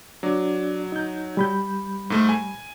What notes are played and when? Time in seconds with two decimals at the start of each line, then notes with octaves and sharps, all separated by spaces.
0.23 F#3 D4 D5
0.92 D#4 G6
1.37 G3 B5 G6
2.10 G#2 A3
2.29 G#5